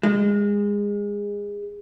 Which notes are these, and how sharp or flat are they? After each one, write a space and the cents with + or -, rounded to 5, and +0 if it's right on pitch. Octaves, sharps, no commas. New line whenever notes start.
G#3 -25